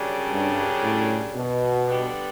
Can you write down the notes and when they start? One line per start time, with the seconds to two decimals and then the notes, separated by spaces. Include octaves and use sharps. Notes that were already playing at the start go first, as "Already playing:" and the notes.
Already playing: F#2 C#3 G3 D4
0.30 G2
0.82 A2
1.35 B2
1.87 D3 G3 B3 D4